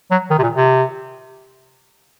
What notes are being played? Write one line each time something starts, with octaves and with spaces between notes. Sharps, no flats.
F#3
D#3
C3
A#2
C3